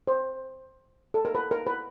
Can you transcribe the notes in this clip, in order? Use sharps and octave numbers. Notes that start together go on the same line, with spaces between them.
C5
A4
A#4
B4
A#4
B4